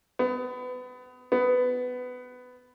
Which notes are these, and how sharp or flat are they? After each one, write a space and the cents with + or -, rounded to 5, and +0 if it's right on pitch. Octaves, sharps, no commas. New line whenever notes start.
B3 +30
B3 +20